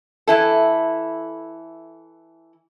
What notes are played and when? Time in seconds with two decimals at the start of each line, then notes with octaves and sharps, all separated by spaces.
0.27 E3 E4 A4